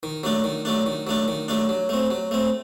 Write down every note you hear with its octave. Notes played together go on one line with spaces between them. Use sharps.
D#3
F#3 A3 D4
D#3
F#3 A3 D4
D#3
F#3 A3 D4
D#3
F#3 A3 D4
F#3
A3 C4
F#3
A3 C4